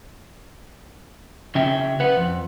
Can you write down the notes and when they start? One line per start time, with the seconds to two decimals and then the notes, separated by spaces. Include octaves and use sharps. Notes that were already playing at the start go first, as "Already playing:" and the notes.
1.55 C#3 F#3 C#4 E5 G5
2.00 B4 F#5
2.17 F2